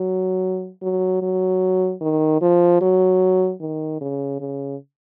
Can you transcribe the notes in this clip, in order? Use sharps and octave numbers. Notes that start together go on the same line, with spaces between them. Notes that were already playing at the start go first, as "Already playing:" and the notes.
Already playing: F#3
F#3
F#3
D#3
F3
F#3
D#3
C#3
C#3